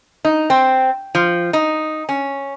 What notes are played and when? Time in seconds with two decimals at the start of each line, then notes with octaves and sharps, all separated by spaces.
0.25 D#4
0.50 C4
1.15 F3
1.53 D#4
2.09 C#4